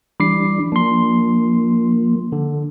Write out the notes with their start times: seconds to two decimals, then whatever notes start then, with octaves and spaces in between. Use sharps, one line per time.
0.20 E3 G3 D4 B5 D6 C7
0.72 F3 A#3 D4 C6
2.32 D3